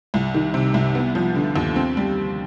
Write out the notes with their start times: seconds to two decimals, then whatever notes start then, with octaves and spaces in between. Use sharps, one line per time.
0.14 C2
0.34 D#3
0.54 C3
0.74 C2
0.95 B3
1.15 F3
1.35 D3
1.56 D#2
1.76 C4
1.97 G3